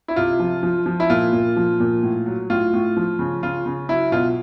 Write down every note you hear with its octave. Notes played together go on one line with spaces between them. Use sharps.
E4
C3 F4
F3
F3
F3
E4
A#2 F4
A#2
F3
A#2
A2
F#3
A2 F4
A2
F3
C#3
C#3 F4
C#3
F#3 E4
B2 F4